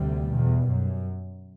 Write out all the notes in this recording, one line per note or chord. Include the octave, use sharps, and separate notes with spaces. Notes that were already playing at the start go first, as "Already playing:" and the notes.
Already playing: D2 C3 G3
E2 B2
F#2